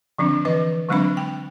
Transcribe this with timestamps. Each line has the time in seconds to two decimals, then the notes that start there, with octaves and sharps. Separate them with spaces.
0.18 D3 F3 C4 D4
0.45 E3 B4 D#5
0.89 D3 F#3 G#3 C4 D4 B5
1.17 G5